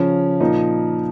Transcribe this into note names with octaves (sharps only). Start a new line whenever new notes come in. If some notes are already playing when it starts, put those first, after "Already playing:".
Already playing: C#3 F3 C#4
A#2 F3 A#3 D#4